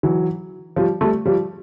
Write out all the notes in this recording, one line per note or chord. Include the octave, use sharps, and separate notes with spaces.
E3 F#3
F3 G3
G3 A3
F3 G3